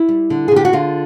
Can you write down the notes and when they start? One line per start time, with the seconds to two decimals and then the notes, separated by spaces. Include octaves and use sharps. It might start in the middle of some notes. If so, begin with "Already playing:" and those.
Already playing: E4
0.09 G3
0.30 D3
0.48 G#4
0.51 D3 G4
0.65 F#4
0.73 D3 F4